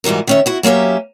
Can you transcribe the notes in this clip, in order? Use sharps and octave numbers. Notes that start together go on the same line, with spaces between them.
G#2 E3 G3 F#4 A#4
D#3 C#4 E5
E4 F#4
F#3 A#3 C#4 G4 E5